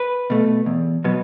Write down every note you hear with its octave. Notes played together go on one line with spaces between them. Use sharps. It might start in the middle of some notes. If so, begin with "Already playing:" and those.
Already playing: B4
B2 A3
E2
B2 F#3 B3